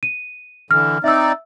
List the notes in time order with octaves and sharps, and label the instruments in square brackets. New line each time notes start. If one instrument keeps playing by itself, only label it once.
[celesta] D#7
[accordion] D3 E3 [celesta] F6
[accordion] C4 D#4 D5 [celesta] E5 E6